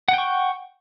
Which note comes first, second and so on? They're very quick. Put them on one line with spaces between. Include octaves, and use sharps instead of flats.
F#5 G5 C#6